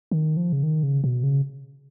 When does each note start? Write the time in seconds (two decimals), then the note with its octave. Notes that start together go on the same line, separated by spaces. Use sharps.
0.11 D#3
0.37 F3
0.53 C#3
0.63 D#3
0.83 C#3
1.04 B2
1.23 C#3